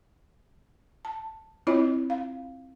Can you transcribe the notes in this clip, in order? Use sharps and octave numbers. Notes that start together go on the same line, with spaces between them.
A5
C4 E4 F4 C#5 D#5
F5